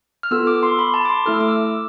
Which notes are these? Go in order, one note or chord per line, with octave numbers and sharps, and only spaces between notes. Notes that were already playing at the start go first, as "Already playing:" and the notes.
F6
B3 F4 A4 E6
D6
C6
B5
A5
D6
C6
A3 E4 A4 F6
E6
D6
E6